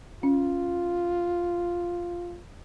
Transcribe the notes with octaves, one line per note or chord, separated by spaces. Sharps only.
C#4 F4